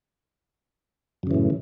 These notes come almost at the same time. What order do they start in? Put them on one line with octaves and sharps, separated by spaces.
F#2 C#3 E3 A2